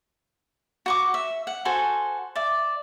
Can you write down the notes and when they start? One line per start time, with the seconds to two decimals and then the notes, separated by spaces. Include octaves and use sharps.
0.86 F#4 C#6 D6
1.14 E5
1.47 F#5
1.65 F#4 A4 C5 G#5
2.36 D5 E5